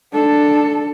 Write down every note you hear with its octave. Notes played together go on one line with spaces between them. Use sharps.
D4 A4